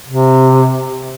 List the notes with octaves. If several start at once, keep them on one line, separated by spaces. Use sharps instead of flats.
C3